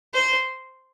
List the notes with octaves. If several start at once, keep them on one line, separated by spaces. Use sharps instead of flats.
C5